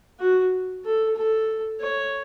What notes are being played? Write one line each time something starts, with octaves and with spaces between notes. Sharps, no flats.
F#4
A4
A4
C#5